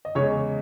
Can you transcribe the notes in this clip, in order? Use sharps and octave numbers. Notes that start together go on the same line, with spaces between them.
D#5
E2 C#3 G#3 C#5